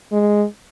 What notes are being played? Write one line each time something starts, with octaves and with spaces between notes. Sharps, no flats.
G#3